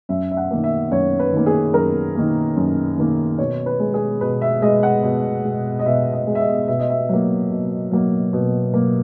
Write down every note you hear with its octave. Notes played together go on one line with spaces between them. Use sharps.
F#2 E5
E5
F#5
D#3 A#3
E5
F#2 C#5
B4
D#3 A#3
G#4
F#2 A#4
D#3 A#3
F#2
D#3 A#3
B2 C#5
B4
G#3
G#4
B2 B4
E5
G#3 D#5
F#5
B2
G#3
D#5
B2 E5
D#5
G#3
E5
D#5
B2 E5
D#5
E5
F#3 A#3
B2
F#3 A#3
B2
F#3 A#3